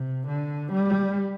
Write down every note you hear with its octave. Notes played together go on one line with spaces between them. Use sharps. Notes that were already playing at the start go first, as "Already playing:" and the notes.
Already playing: C3
D3
G3